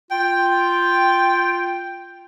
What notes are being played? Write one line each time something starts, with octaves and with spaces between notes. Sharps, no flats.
F4 G5